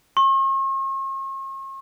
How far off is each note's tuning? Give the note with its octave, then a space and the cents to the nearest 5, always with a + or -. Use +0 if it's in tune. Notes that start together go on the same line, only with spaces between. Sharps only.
C#6 -45